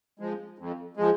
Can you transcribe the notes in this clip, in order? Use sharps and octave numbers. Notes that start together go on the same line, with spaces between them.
F3 G#3
F2
F3 G#3